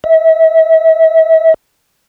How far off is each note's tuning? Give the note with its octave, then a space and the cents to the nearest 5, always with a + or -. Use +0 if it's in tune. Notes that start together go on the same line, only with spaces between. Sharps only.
E5 -35